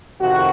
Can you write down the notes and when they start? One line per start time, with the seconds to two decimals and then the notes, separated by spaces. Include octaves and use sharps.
0.20 F2 C3 D#3 F#4